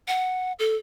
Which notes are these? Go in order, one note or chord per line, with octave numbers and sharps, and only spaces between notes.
F#5
A4